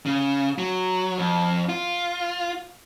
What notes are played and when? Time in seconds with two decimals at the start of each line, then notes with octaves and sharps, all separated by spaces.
0.06 C#3
0.58 F#3
1.18 F2
1.69 F4